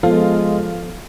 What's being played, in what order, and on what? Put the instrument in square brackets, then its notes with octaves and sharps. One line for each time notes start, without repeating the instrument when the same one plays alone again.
[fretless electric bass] F3 [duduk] G#3 [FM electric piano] B3 A4 [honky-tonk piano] F4